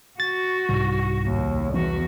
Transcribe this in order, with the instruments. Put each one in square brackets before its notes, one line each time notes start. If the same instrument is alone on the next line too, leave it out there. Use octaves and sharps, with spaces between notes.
[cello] F#4 [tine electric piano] A6
[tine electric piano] C2 [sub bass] G#2
[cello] D#2
[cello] E2 F#4 [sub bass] E3